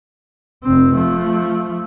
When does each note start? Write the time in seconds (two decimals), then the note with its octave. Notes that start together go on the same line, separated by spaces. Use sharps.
0.63 F1 C4
0.95 F3 A3